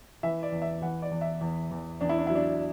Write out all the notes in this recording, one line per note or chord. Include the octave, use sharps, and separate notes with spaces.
E3 E5
D5
E2
E5
E3 F#5
D5
E2
E5
E2
E2
E2 D4
E4
D4
F#3 E4
D4